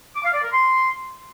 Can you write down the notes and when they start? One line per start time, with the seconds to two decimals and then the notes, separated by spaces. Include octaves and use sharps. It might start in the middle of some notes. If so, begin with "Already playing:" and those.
0.15 D6
0.24 F5
0.33 D5
0.42 A#4
0.51 C6